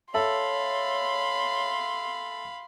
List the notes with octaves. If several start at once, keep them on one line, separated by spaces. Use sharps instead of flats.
A4 C#5 E5 F5 B5 C6